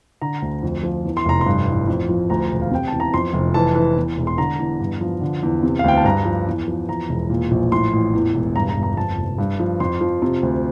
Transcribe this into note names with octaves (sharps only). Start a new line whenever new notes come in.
D3 A#5
D2
F2
F3
E2
C6
F1 A#5
C6
G2
A1
F2
F3
D2 A#5
E1
F5
C3 G5
E2 A5
A#5
F2 C6
F1
E3 A5
E3
E2
E1
C6
D3 A#5
E2
G2
F3
D3
E2
C3
F5
D2 G5
A5
G2 A#5
F3
E2
F3
E2 A#5
E1
A#2
A#1
A2 C6
A1
E2
E1
G2 A#5
A#5
G1
A#5
F2 A5
F1
G2
F3
F2 C6
F3
C3
D2